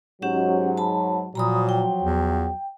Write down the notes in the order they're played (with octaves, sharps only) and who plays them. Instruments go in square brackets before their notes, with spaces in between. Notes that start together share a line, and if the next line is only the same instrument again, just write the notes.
[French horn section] G#2 F#3 [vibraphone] C#4 G4 F#5
[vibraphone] A5 B5
[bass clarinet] A#2 [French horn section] F3 F#3 [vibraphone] A#5 B5 D#6
[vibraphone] G5
[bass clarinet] E2